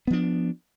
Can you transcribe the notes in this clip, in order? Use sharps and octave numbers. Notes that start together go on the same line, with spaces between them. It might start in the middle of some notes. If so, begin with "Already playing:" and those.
F3 B3 D4